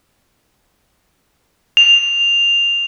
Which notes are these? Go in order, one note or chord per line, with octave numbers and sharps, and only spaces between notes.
F7